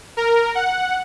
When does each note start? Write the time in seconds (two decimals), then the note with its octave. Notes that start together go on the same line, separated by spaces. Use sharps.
0.17 A#4
0.55 F#5